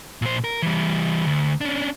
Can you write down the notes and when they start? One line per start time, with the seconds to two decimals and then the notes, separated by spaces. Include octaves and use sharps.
0.22 A#2 C5
0.44 A#4
0.62 E3 G3
1.26 D2
1.61 C#4 D4